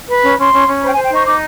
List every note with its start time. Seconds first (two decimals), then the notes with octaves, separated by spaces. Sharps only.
0.09 B4
0.23 C#4
0.28 B5
0.38 C#4 C6
0.53 C#4
0.67 C#4
0.82 C5 B5
0.88 G5
0.93 G#5
0.96 C5
1.04 G5
1.11 D#4 C#6
1.26 D#4 D6